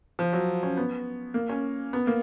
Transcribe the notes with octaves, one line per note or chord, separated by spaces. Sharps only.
F3
F#3
C#4
B3
A#3
C#4
B3
A#3